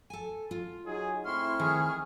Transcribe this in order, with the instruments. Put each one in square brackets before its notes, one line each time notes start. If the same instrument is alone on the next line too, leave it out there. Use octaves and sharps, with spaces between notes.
[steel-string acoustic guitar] A4 G#5
F4
[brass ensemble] F#3 D#4 G#4
[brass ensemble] A3 C4 E4 [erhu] C6 [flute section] C#6 F6
[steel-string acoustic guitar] D#3 [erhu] G#4